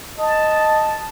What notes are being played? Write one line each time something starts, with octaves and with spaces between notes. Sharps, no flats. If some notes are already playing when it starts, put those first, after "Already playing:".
D#5 A5